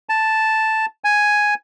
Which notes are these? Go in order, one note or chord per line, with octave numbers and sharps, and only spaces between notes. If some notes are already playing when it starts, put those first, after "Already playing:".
A5
G#5